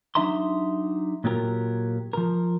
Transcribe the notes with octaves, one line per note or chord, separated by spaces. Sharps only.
F#3 D4 D#4 E5 A#5 C6
A#2 F#3 F4 G4 G#4 A#4
F3 A#4